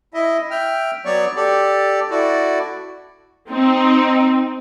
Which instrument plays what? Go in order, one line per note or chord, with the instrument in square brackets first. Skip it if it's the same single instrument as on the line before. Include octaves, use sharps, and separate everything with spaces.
[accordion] E4 D#5 E5
E5 G5 F6
F#3 B3 C#5 D5 C#6
G4 A4 D5
E4 F#4 A4 D5
[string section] C4 D#4